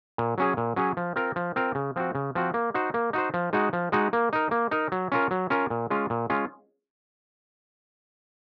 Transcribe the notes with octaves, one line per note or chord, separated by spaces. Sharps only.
A#2
F#3 C#4 G#4
A#2
F#3 C#4 G#4
F3
C4 F4 A#4
F3
C4 F4 A#4
C#3
F3 C4 F#4
C#3
F3 C4 F#4
A#3
D#4 F#4 C5
A#3
D#4 F#4 C5
F3
G#3 D#4 F#4
F3
G#3 D#4 F#4
A#3
D#4 A#4
A#3
D#4 A#4
F#3
C#4 F4 A#4
F#3
C#4 F4 A#4
A#2
G#3 C#4 F4
A#2
G#3 C#4 F4